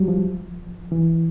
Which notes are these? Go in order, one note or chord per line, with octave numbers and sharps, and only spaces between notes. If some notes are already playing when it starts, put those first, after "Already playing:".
Already playing: F#3 G3
F3
E3